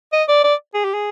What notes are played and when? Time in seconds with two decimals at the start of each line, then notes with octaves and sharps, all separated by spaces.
0.13 D#5
0.28 D5
0.44 D5
0.74 G#4
0.85 G4
0.94 G#4